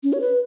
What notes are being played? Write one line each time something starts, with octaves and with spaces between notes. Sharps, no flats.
C#4
C#5
B4